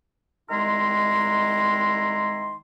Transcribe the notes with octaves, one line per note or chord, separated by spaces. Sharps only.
C2 D#3 G#3 E4 A#5 C6